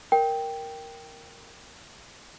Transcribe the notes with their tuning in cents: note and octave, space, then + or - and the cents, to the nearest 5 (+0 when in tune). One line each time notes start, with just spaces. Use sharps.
A#4 +0 G5 +0